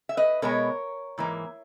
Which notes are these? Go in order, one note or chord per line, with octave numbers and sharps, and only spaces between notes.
E5
B4 D#5
B2 G#3 B3 A#4 C#5
G#2 E3 A#3